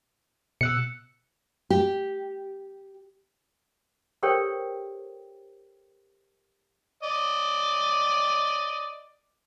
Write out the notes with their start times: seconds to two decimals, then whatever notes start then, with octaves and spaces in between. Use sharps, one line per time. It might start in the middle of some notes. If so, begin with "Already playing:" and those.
0.61 B2 E6 F#6 C#7
1.70 G4
4.23 G4 A4 A#4 C5 C#5 G5
7.03 D5 D#5